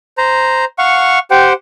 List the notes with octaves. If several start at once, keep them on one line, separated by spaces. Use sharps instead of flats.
C5 A#5
F5 F#5 C#6
G4 C5 F#5 G5